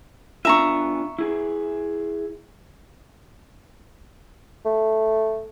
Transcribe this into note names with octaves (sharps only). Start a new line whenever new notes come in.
B3 D4 F4 E5 A#5 C#6
E4 G#4
A3